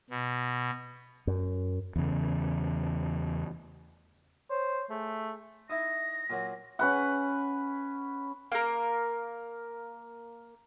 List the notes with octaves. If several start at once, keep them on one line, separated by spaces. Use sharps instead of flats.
B2
F#2
E2 C#3
C5 C#5
A3 G#4
D#4 E4 A#6
A#2 F#3
C#4 B4 F#5
A#3 A#4